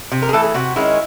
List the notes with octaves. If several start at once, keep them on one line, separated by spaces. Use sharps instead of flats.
C3
A#4
G#4
E3 A3 A4
G#4
C3 F#4
D#3 G#3 C#4 E4